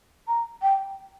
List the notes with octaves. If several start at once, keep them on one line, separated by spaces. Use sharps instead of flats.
A#5
G5